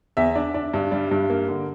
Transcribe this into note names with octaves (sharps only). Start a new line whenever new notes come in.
E2 E5
D4
D4
G2
G3
G2
A#3
D3